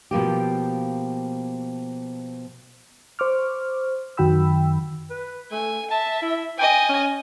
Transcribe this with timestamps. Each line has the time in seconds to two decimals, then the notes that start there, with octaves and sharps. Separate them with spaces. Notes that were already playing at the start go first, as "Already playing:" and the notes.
0.11 B2 F3 A#3 G4
3.19 C5 C#6 D6 F6
4.17 F#2 D#3 F#4 G5 B5 E6
5.10 B4
5.51 A3 G#5
5.91 E5 A5
6.22 E4
6.59 D#5 G5 G#5
6.89 C#4